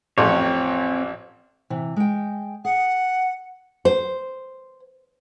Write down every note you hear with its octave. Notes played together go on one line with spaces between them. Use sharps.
A1 F2 C4 C#5
C3 E3
G#3 G5
G#4 F#5
C5